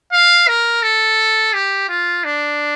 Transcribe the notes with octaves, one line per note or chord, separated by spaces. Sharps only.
F5
A#4
A4
G4
F4
D4